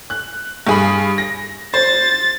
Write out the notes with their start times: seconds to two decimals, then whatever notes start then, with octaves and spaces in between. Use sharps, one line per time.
0.10 F#6
0.67 G2 G#4 B5
1.18 A#6
1.74 C5 A6